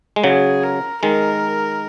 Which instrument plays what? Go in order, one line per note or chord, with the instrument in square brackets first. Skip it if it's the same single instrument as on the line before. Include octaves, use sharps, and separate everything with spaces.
[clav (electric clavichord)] G#3
[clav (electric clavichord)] C#3 F#3 [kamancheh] G#4
[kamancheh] A#4
[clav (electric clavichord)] D#3 G#3 [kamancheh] A#4